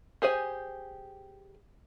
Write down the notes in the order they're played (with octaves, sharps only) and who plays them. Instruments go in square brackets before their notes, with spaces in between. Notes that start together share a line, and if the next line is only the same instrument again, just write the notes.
[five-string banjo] G4 G#4 C5 G#5